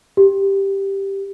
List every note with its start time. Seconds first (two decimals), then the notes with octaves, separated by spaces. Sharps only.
0.17 G4